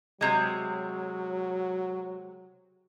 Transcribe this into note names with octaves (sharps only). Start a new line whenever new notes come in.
C3 F#3 G#3